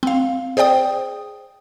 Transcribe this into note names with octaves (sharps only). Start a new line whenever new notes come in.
C4 F5
G#4 C5 D5 G5 D#6